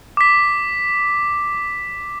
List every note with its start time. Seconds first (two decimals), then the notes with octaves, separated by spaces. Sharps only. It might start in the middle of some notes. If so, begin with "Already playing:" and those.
0.17 D6 B6